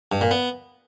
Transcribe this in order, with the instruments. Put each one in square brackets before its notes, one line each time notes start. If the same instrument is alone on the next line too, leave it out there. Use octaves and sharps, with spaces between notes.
[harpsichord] G2
A#2
B3